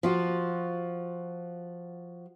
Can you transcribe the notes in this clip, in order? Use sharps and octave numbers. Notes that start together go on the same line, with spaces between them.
F3 F4 F#4